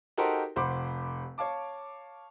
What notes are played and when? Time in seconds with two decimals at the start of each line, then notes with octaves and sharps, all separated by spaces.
0.17 D#4 F#4 G4 A4 A#4 C5
0.56 F1 C5 F#5 B5 D6
1.38 C#5 F5 A5 D6